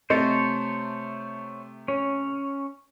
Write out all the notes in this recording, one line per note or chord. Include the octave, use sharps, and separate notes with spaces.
C3 A3 C5 C#5 D#5 A5
C#4 C#5